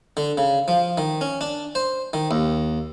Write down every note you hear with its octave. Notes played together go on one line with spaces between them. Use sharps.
D3
C#3
F3
D#3
C#4
D4
C5
D#3
D#2